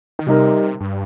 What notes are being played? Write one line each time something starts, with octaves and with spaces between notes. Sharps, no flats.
D#3
C3 G3 D#4 A#4
G2